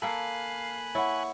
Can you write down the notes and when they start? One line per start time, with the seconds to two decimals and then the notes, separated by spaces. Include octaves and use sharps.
0.02 A#3 A4 F5 G#5 B5 F#6
0.95 E4 C#5 F#5 C#6